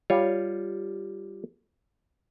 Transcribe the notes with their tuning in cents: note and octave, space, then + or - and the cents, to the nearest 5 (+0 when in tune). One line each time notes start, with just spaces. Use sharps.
G3 +0 F4 +0 C#5 +0